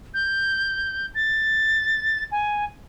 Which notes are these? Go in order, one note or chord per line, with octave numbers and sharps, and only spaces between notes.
G6
A6
G#5